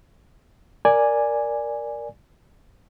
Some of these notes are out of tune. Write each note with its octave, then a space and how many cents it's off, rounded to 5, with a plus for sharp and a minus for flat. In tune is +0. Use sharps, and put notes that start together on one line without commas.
A#4 +0 D5 +0 G#5 -5